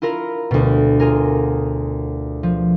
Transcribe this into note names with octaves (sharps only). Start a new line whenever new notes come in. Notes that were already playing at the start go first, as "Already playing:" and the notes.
E4 F4 A#4 A#5
D2 B2
F4 G#4 A#4
F3